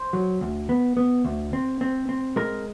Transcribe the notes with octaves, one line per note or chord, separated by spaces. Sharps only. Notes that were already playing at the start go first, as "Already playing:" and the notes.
Already playing: C5
F#3
D2
B3
B3
D2
C4
C4
C4
G#3 A#4